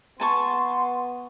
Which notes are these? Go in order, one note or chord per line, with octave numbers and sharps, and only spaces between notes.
B3 G#5 A5 C6 C#6